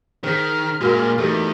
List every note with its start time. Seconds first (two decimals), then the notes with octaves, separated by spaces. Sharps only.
0.24 D#3 G#4 C5 F6 B6
0.81 A#2 G#3 F#4 A#4 F#5
1.18 E2 G3 A3 D#4 A4